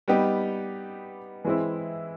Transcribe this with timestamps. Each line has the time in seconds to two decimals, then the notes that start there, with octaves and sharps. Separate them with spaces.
0.08 G3 B3 D#4 G4
1.45 E3 G#3 C4 E4